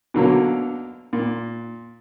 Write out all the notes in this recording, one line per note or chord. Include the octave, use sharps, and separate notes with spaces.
B2 D3 F#3 A#3
A#2